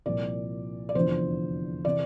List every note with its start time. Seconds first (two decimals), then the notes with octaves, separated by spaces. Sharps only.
0.06 C2 A#2 F3 D5
0.89 D5
0.95 F1 E2 D3 F3 C5
1.85 C3 E3 D5